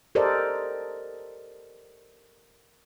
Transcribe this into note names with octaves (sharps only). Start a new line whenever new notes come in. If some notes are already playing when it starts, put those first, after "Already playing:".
G4 A4 A#4 C5 D5 D#5